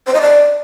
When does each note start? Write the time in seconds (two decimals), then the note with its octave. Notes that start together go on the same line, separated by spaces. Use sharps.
0.07 C5
0.14 D#5
0.21 D5